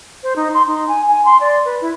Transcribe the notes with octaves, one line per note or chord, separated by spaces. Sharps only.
C5
D#4
C6
D#4
G#5
G#5
C6
D5
B4
E4